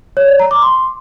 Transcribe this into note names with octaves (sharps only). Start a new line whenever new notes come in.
C#5
D5
A#5
D6
C6